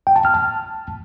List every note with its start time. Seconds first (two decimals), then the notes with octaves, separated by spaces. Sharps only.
0.07 G5
0.16 A5
0.25 F6
0.34 A5